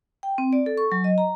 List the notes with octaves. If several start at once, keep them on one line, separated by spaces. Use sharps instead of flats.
G5
C4
D5
A4
C#6
F#3
D#5
A#5